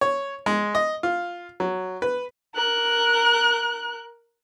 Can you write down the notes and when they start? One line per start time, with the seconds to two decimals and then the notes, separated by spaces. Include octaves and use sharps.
0.01 C#5
0.46 G#3
0.75 D#5
1.03 F4
1.60 F#3
2.02 B4
2.55 A#4 F#6